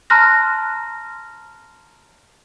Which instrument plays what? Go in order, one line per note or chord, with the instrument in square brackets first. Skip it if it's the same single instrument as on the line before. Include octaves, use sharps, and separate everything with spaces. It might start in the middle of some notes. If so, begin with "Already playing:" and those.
[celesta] A5 A#5 C6 F6 F#6 A#6